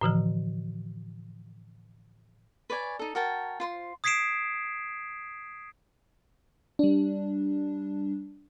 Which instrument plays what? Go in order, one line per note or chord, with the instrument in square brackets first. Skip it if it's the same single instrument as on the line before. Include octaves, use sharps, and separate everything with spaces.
[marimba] A2 D3 E3 F3
[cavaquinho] B4 C#5 D5 G#5
D#4 A4
F#4 A#4 G5 A5
F4 C5 C6
[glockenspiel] D#6 G#6 B6 C7 D7 E7
[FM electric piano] G3 D4